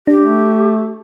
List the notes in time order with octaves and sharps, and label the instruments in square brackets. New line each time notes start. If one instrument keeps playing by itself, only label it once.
[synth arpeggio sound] D4 [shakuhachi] G4
[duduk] A3